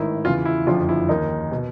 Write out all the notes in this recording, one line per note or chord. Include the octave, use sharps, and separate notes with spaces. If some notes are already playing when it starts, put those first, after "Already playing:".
Already playing: A1 G#2 D#3 E4
E2 C#3 E3 F4
E4
F#1 F2 D3 F3 F4
E4
D#2 D#3 D#4
B2